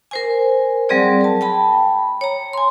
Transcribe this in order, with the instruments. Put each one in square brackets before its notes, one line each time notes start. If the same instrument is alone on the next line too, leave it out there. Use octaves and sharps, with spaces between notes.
[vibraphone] A#4 C5 G#5
F#3 G3 C4 G#4 D5
A#4 A5
G5 A5 B5
C#5 A#5
G#5 C6